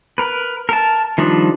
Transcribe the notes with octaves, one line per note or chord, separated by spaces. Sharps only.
A#4 B4
A#4 A5
D#3 F3 G3 D4